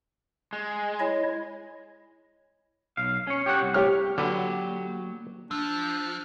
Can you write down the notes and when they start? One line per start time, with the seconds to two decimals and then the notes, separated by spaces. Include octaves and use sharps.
0.53 G#3
1.00 E4 C#5 D#5
2.97 B1 F5
3.27 C#4 C#5
3.46 G4 C#5 F#5
3.61 C2
3.74 G4 C#5 F6
4.18 D3 F#3 A#3 F#4 G4 B4
5.51 F3 D4 E6